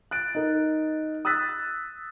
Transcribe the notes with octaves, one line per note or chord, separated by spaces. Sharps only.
F#6 A6 D7
D#4 A#4
D#6 E6 F#6 A6 B6